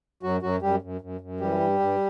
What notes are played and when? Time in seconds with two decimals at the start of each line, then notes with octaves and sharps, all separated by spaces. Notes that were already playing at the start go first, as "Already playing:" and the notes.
0.23 F#2 F#3 F#4
0.42 F#2 F#3 F#4
0.62 F#2 G3 G4
0.81 F#2
1.01 F#2
1.21 F#2
1.40 E3 G3 G4
1.60 G2
1.80 G2